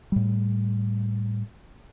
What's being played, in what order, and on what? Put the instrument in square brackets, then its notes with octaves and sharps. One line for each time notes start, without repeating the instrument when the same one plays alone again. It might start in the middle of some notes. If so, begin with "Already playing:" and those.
[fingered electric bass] A2 G3